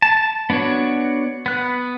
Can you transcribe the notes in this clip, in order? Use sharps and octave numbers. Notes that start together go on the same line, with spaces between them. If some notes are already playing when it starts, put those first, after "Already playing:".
A5
B3 D4 F#4 C#5
B3 F#6